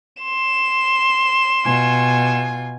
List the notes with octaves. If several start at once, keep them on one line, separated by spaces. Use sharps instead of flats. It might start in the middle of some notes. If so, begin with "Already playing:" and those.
C6 E7
B2 F4 G#5